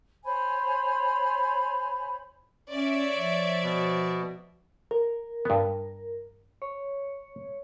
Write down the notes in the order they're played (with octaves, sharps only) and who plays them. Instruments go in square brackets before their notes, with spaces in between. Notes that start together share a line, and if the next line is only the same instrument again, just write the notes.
[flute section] C5 C#5 G#5 B5
[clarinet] C#4 [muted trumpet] C#5 [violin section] D5 E5
[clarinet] F3
[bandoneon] B2
[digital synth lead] A#4
[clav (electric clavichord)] G2 B3
[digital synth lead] C#5